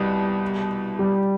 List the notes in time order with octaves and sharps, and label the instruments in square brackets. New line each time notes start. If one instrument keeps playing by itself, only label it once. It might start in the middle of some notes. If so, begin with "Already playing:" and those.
Already playing: [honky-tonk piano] C2 B2 [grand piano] G3
[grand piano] G3